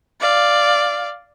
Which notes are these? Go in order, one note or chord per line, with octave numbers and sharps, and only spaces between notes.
D5 F5